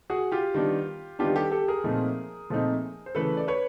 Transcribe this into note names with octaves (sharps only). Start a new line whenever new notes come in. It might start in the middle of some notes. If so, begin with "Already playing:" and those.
F#4 G#4
F4 G4
D#3 G3 B3 D4
D#3 G3 B3 D4 F4 G4
G4 A4
G4 A4
G#4 A#4
A#2 F3 A3 C4 D#4
A#2 F3 A3 C4 D#4
C5
C#3 E3 A3 A4 B4
D5
B4 C#5